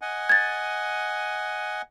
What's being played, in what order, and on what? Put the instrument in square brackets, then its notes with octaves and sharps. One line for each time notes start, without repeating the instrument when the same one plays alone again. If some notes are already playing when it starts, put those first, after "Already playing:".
[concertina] D#5 F#5 G#5
[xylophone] G#6 A6